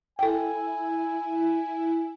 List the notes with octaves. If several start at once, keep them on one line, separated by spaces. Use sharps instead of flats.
E4 A4 G5 G#5